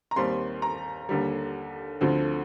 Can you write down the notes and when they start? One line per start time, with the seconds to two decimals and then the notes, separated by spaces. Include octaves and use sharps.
0.11 A#5
0.16 D#2 D#3 G3 C4 C6
0.62 A#5
1.09 D#2 D3 G3
2.01 D2 D3 F3 C4